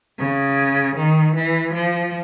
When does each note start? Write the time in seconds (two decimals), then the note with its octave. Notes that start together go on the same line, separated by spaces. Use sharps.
0.19 C#3
0.96 D#3
1.35 E3
1.73 F3